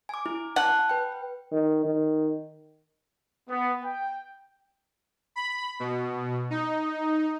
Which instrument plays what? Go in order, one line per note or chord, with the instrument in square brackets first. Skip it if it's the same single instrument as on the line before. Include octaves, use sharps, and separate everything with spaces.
[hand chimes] G#5 D6
E4
[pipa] F#5 [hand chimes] A5
[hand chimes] B4 G5
[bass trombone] D#3
D#3
[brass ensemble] B3
G5
[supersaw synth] B5
B2
D#4